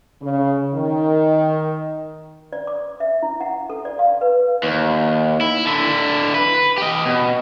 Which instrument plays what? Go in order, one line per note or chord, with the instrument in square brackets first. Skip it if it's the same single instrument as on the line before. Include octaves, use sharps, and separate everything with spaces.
[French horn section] C#3
D#3
[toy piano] D5
D6
E5
E4
F#5
A4
D5
F5
B4
[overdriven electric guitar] D#2
E4
D3 E4
B4
G4 D#5
B2